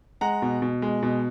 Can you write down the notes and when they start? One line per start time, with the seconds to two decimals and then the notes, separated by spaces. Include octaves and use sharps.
0.21 G#3 F#5 A#5
0.42 B2
0.62 B2
0.82 G#3
1.03 B2